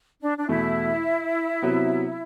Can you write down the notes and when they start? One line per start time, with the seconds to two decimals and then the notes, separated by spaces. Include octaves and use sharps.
0.21 D4
0.37 D4
0.49 E2 B2 A3 E4
1.62 C3 F#3 B3